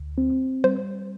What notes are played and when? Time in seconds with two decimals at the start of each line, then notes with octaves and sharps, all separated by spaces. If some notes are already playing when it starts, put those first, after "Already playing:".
Already playing: D2
0.18 C4
0.64 G3 C5